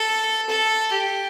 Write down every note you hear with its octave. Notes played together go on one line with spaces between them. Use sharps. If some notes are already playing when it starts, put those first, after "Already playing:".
Already playing: A4
A4
G4